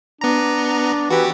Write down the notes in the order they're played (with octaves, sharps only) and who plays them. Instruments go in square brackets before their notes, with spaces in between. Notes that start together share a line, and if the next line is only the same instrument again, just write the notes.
[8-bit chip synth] B3 A#5 [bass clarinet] D4
[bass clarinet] E3 [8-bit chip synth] F#4 G4